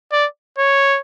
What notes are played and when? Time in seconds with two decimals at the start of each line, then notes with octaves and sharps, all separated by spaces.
0.12 D5
0.58 C#5